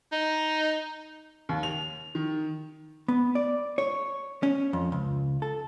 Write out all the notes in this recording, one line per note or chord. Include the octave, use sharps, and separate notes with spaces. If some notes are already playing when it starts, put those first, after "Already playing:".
D#4
D#2
F7
D#3
B3
D5
C#5
C#4
F2
C#2
A4